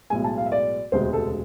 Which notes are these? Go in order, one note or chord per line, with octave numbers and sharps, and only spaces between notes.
B1 A2 G#3 G#5
A5
F5
E5
D5
E1 D2 C3 G#3 C5
A4